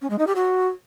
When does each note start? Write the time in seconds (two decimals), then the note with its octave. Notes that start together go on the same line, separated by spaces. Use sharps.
0.01 C#4
0.10 G#3
0.18 D#4
0.27 G4
0.35 F#4